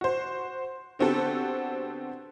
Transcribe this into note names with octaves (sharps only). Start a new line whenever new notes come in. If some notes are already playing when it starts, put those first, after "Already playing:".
F#4 C5
D3 B3 C4 F#4 G4 A4